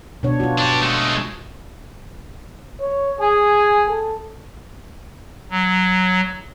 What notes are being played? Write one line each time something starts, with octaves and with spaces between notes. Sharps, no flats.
B2 D4 C#5
F4 F#4
D4 G4
G#3 A3
C#5
G#4 G#5
A4
F#3